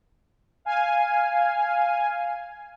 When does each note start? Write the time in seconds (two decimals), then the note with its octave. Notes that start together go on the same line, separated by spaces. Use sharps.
0.65 F5 G#5